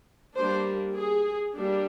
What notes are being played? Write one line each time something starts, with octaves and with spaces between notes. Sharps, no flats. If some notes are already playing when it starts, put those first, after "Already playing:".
G3 A#3 D4 C5
G#4
G3 A#3 D4